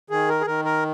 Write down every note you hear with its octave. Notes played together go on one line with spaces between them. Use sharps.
D#3 G#4
A#4
G#4
D#3 A#4
A#4